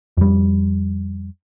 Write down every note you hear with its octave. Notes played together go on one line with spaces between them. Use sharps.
F2 G3